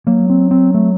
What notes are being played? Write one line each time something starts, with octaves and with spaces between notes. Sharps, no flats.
F#3 A#3
C4
C4
A3